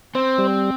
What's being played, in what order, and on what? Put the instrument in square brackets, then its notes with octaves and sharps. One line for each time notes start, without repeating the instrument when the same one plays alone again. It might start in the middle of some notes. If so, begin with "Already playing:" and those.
[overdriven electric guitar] C4 [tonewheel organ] C5
[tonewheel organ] G3